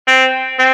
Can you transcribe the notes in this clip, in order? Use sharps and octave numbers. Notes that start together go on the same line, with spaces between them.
C4
C4